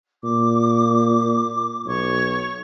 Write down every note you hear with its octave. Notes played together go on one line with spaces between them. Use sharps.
A#2 D6
B1 C#5 C#6